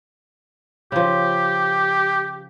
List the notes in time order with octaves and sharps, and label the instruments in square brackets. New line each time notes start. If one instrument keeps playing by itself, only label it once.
[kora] C#3 F3 [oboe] G4